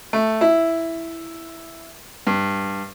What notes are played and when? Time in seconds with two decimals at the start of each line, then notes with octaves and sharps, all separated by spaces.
0.13 A3
0.41 E4
2.27 G2